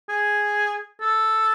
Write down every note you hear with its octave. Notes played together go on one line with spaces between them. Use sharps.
G#4
A4